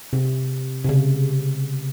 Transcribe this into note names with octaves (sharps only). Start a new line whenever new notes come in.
C3
C3
C#3